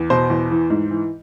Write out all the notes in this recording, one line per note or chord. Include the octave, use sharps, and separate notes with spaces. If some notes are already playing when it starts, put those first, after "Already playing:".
Already playing: E2
B2 C5
E2
E3
G#2
E3